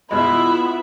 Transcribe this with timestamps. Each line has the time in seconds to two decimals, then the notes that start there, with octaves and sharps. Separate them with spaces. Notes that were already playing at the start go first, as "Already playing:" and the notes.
0.11 B2 G#3 B3 E4 F4 E5 B5